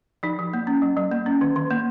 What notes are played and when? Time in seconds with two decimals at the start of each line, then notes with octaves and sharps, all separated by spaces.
0.23 F3 D#4
0.39 F3
0.54 A#3
0.67 C#4
0.82 F#3
0.97 F#3
1.12 A#3
1.26 C#4
1.41 D#3
1.56 D#3
1.70 A#3